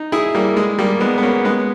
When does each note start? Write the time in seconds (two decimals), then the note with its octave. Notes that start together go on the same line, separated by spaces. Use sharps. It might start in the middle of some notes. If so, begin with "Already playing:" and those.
Already playing: D#4
0.12 E4 G#4
0.35 G3 A#3
0.57 G#3
0.79 G3 A#3
1.00 G#3 B3
1.18 B3
1.23 A#3 C#4
1.45 G#3 B3